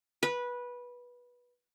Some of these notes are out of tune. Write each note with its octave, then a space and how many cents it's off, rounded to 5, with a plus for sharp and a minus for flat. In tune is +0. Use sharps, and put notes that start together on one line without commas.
B4 -15